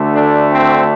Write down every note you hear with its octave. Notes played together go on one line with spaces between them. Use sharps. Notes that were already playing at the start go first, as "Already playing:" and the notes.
Already playing: D2 D3 A3
D4
C4